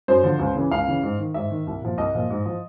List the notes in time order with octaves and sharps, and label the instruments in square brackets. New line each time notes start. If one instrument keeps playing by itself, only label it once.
[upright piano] F#2 C5
D3 F3
C#2
C#3 E3
C#2 F5
C#3 E3
G#2
D#3
G#2 E5
D#3
C2
A#2 F3
C2 D#5
A#2 F3
G#2
F3